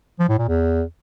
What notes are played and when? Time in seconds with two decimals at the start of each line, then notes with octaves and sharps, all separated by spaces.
0.19 F3
0.29 A2
0.38 A#2
0.48 E2